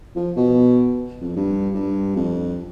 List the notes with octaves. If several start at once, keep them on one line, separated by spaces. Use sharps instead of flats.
F3
B2
F2
G2
G2
F2